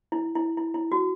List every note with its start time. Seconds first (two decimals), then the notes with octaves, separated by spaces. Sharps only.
0.12 E4
0.35 E4
0.57 E4
0.74 E4
0.92 F#4